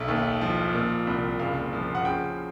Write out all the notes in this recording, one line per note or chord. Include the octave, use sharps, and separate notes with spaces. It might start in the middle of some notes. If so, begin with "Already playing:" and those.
Already playing: B1 E5
D#2
F3
A#2
C2
F#1 F5
F3
F#5
C#3 G5